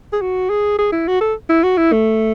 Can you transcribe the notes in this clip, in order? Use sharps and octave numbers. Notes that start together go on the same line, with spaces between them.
G#4
F#4
G#4
G#4
E4
F#4
A4
E4
F#4
E4
A3